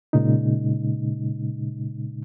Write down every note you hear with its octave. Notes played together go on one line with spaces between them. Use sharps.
A#2 C#3 G#3 D#4